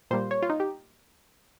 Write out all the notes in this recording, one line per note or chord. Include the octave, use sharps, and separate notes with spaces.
A#2 G3 A#3 C5
C#5
F4
D#4
G4